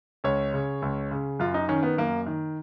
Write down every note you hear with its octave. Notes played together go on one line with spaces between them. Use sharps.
C#2 C#5
C#3
C#2
C#3
F#2 F4
D#4
D#3 C#4
B3
F#2 A#3
D#3